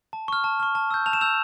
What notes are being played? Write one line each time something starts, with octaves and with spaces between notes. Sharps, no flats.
A5
C#6 F6
A5
C#6 F6
A5
E6 G6
A5 F7
E7
E6 G6 F7